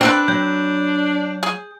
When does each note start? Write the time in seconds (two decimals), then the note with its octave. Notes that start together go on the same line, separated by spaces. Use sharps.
0.01 C4 D4 A4 B4 G5
0.28 F#3 G6
1.43 G#4